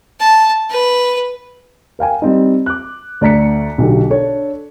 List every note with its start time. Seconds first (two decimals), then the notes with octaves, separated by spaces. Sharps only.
0.20 A5
0.70 B4
1.99 A#4 F5 G5 G#5
2.22 G3 C4 D#4
2.66 D6 F#6
3.21 D2 D5 A#5 B6 C#7
3.78 B1 B2 D3 G4
4.10 D4 A4 C#5